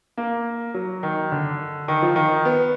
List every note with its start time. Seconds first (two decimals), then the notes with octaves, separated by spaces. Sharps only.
0.18 A#3
0.74 F#3
1.03 D#3
1.32 D3
1.88 D#3
2.02 F3
2.16 D#3
2.45 B3